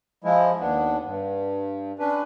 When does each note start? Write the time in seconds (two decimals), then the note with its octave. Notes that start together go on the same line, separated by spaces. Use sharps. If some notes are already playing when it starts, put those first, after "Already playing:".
0.24 F3 G#3 E4
0.60 D#2 B3 D4
1.05 G2
1.99 C#4 D4 B4